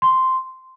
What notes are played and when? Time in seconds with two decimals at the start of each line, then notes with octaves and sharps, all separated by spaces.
0.02 C6